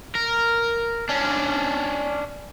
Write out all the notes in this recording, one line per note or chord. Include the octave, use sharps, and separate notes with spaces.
A#4
C#4 D4